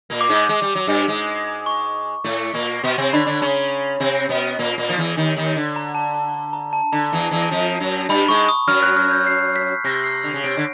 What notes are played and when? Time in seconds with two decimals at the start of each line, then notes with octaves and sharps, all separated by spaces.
0.10 A#2 A#3
0.21 D6
0.29 G#2 G#3
0.49 G#3
0.62 G3
0.75 F#3
0.87 G2 G3
1.08 G#2 G#3
1.66 C#6
2.24 A2 A3
2.54 A#2 A#3
2.83 B2 B3 C6
2.98 C3 C4
3.13 D3 D4 B5
3.27 D3 D4
3.42 C#3 C#4 A#5
4.00 C3 C4
4.29 B2 B3
4.59 A#2 A#3
4.78 A#2 A#3
4.89 F3
4.98 E2 E3
5.17 D#2 D#3
5.36 D#2 D#3
5.56 D3
5.76 A#5
5.95 A5
6.15 A5
6.34 A5
6.53 A#5
6.73 A5
6.92 D3 A#5
7.12 E2 E3
7.31 E2 E3
7.51 F2 F3
7.80 F#2 F#3
8.09 G2 G3 B5
8.29 G#2 G#3 C#6
8.49 D#6
8.67 F#2 F#3 F6
8.83 F#6
8.97 F6
9.11 G6
9.27 C7
9.56 B6
9.84 C3 A#6
10.04 C7
10.24 D3
10.34 C#3
10.44 C3 D7
10.57 D3